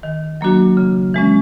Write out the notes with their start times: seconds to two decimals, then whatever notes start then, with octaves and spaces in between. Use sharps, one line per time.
0.03 D#3
0.41 F#3 A#3 D4 F#4
0.77 C#3
1.14 E3 G#3 C#4